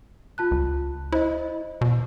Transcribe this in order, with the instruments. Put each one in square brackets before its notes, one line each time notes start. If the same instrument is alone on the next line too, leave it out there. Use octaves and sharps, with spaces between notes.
[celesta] F4 A5 F#6
[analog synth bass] C#2
[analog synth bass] E4 [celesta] C5 D#5
[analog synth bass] B2